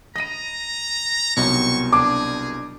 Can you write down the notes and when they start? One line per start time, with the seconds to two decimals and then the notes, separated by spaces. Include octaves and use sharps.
0.16 D#5 A#5 B5 A#6 D#7
1.37 C2 B2 F#3 D#4 G4 C#6
1.93 D4 G#4 D6